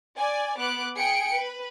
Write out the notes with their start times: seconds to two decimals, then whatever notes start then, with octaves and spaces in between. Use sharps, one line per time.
0.18 D5 G#5
0.58 B3 D6 F#6 D7
0.97 G#4 G5 C#7 D7
1.33 B4